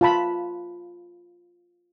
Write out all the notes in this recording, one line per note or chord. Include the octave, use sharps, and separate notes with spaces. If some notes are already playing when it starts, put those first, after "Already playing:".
F4 A5 B5